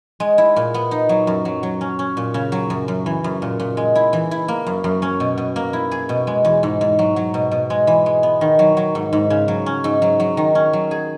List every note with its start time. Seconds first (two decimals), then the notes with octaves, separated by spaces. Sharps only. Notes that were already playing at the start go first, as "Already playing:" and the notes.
0.20 G#3
0.38 E4
0.56 A#2
0.74 B3
0.91 D#4
1.09 F#3
1.27 F#2
1.45 F#3
1.63 F#3
1.81 C#4
1.99 C#4
2.17 A#2
2.34 C#3
2.52 F#3
2.70 F#2
2.88 F#2
3.06 E3
3.24 F#2
3.42 A#2
3.60 A#2
3.77 G#3
3.95 E4
4.13 E3
4.31 E4
4.48 A#3
4.66 F#2
4.84 F#2
5.02 C#4
5.20 B2
5.38 B2
5.56 A#3
5.73 E4
5.91 G#4
6.09 B2
6.27 G#3
6.45 E2
6.63 G#2
6.81 G#2
6.99 F#3
7.16 F#3
7.34 B2
7.51 B2
7.70 G#3
7.87 E3
8.06 G#3
8.23 B3
8.41 D#3
8.59 F#3
8.77 F#3
8.95 G#2
9.13 G#2
9.30 C#3
9.48 F#3
9.66 C#4
9.84 G#2
10.02 F#3
10.20 F#3
10.37 D#3
10.55 C#4
10.73 F#3
10.91 G#4